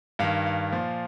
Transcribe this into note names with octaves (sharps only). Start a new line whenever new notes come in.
G2 D#3 F5
F5
A#2 F3